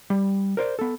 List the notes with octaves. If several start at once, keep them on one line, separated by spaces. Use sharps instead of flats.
G3
A#4 C5 D5
B3 A4